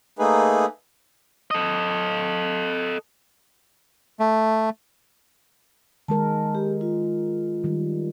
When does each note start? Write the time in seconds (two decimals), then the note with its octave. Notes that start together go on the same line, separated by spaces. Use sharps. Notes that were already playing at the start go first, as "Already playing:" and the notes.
0.19 A3 A#3 D#4 G#4 B4
1.51 A4 D#5
4.20 A3
6.08 D#3 G#3 A#4 A5
6.55 G4
6.81 F4
7.64 D#3 G3